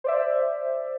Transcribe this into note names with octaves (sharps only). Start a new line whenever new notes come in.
C5 D5 E5